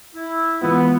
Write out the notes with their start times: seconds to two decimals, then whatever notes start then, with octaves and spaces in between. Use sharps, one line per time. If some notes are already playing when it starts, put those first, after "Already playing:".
0.15 E4
0.62 E3 G#3 B3 F4